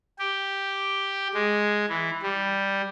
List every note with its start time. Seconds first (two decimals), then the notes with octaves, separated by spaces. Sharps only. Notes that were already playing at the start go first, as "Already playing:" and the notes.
0.19 G4
1.34 G#3
1.89 E3
2.22 G3